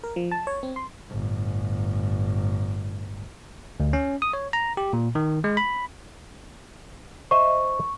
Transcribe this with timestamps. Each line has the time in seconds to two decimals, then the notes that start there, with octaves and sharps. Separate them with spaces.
0.04 A#4
0.16 F3
0.32 A5
0.47 C#5
0.63 C4
0.76 C6
1.10 G1 A2
3.80 D2
3.93 C#4
4.22 D#6
4.33 C#5
4.53 A#5
4.77 G4
4.93 A#2
5.15 D#3
5.44 G#3
5.57 B5
7.31 C5 D#5 E5 C#6